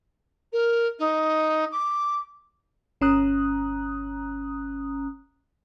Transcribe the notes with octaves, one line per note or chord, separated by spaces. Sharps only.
A#4
D#4
D6
G1 C#4 A#5 D#6 F#6